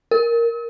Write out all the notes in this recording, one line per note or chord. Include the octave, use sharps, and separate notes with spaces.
A#4